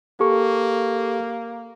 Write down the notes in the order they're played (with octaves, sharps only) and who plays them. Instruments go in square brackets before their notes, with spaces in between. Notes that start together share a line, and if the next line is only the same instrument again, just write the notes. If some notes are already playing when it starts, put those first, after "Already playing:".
[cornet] A#3 [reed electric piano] G4 A4 C#6